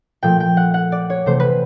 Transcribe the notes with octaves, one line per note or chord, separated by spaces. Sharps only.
A#2 F3 A3 G5
G5
F#5
F#5
D5
C#5
C3 E3 A3 C5
B4